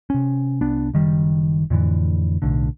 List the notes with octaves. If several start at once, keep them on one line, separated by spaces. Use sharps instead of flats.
C3 C#4
C2 B3 D4
F#1 D#3 G3
F2 A2 D3 E3
B1 A2 D3